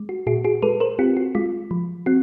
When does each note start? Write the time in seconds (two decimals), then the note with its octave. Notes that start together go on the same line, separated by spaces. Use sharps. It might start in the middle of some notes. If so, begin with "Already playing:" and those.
Already playing: G#3
0.09 F#4
0.27 A#2 F#4 G#4
0.44 F#4 G#4
0.62 G#3 A4 B4
0.80 A#4 C5
0.99 C4 F4 G4
1.17 F#4
1.35 G#3 F4
1.71 F3
2.06 C4 F#4